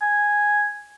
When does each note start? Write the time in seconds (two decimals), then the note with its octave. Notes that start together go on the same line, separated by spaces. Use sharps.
0.01 G#5